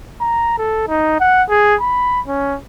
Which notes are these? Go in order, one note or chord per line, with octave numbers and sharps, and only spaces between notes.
A#5
A4
D#4
F#5
G#4
B5
C#4